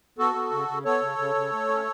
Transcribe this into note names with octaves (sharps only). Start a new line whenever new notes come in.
B3 F#4 A4
B3
C#3
C#3
B3 A4 C#5
C#3
C#3
C#3
A3
C#4